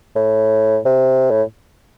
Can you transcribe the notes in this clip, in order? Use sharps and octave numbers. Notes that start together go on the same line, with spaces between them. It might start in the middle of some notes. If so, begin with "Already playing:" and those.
A2
C3
A2